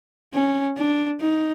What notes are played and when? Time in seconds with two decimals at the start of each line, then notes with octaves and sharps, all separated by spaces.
0.34 C#4
0.78 D4
1.20 D#4